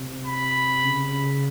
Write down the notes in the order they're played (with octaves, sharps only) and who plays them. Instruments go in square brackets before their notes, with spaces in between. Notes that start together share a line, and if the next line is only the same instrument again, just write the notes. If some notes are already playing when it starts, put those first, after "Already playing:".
Already playing: [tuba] C3
[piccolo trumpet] B5
[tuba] C#3